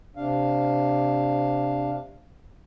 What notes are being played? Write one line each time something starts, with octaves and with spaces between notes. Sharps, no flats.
C3 D4 F5